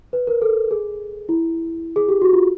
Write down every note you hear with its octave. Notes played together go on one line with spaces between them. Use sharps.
B4
A#4
A4
G#4
E4
G#4
G4
F#4
F4